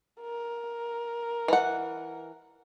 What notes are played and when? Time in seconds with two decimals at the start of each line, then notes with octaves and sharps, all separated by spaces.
0.21 A#4
1.48 E3 F#5